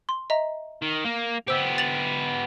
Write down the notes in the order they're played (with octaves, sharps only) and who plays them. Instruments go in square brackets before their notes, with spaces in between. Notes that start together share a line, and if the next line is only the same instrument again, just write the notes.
[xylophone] C6
D#5 E5 A#5
[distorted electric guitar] D#3
A#3
[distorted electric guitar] B3 G4 [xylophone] C5 E6 G6
[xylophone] A6 F7 F#7